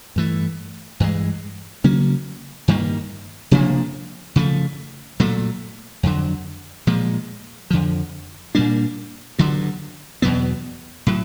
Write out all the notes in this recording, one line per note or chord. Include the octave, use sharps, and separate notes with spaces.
G2 E3 A3
G2 E3 G#3
C#3 F#3 A#3 C#4
G2 D#3 G3 A#3
C3 F3 A#3 D4
C#3 F3 A3
A#2 F#3 A3
F2 D3 F#3
A#2 F3 G#3
F2 D3 F3
A#2 G3 A#3 D4
G2 D3 F#3
E2 B2 F#3 B3
A2 F#3